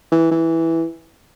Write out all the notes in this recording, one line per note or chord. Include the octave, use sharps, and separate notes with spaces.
E3
E3